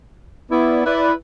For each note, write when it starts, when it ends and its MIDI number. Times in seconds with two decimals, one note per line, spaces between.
0.51 0.83 59
0.51 0.83 64
0.51 0.83 74
0.85 1.12 64
0.85 1.12 71
0.85 1.12 74